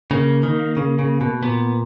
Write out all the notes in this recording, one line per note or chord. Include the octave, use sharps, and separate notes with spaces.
C#3 A#3
D#3
C#3
C#3
B2
A#2 B3